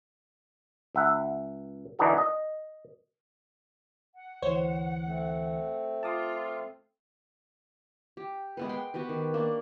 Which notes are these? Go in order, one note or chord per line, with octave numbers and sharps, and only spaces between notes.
C#2 E5 F#5
D3 E3 D4 D#4 F#4 A4
D#5
F#5
D2 E3 C5 C#5
A3 C4
F4 A5 D6 D#6
G4
G#3 B3 B4
G5 C6
B3 F#4 G4 B4
D#3
A#3 D4